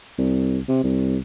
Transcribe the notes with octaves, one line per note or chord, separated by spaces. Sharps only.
C2
C3
C2